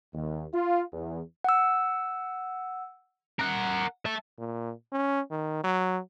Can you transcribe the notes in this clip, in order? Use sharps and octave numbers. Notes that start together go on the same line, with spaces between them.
D#2
F4
E2
F#5 E6
A#4 F#5
E5 A5
A#2
C#4
D#3
F#3